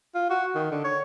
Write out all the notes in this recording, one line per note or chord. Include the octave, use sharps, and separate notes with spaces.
F4
F#4
D#3
D3
C#5